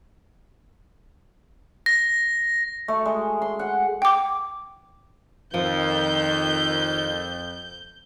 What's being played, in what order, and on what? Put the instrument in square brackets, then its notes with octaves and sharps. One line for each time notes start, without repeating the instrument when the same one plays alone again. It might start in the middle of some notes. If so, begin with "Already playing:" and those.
[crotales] A#6
[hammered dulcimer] A3
G#3
C6
F#5
[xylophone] G5 D6
[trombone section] F2 [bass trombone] D#3 [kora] F3 [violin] G6